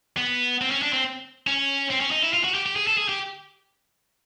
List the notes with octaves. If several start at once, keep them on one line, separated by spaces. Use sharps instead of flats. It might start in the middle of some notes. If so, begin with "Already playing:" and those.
B3
C4
C#4
D4
C4
C#4
C4
C#4
D#4
E4
F4
F#4
G4
G4
G#4
A4
G#4
G4